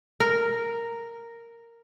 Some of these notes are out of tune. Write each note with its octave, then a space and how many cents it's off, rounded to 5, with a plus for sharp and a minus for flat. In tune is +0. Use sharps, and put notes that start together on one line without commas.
A#4 -5